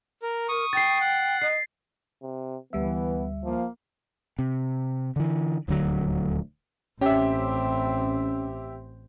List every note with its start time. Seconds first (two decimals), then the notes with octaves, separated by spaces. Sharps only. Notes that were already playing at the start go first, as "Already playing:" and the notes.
0.23 A#4
0.49 A#4 C#6 D#6
0.73 G5 A6 C7
1.01 F#5
1.42 D#5 C7
2.23 C3
2.73 D2 E3 G3 B3 E5
3.44 F3 A#3
4.39 C3
5.16 D3 E3
5.68 D#1 D2 D3 F#3
7.01 A1 C4 C#4 G4 E5